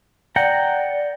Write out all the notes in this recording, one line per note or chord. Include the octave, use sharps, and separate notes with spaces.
D5 F#5 G5 A#5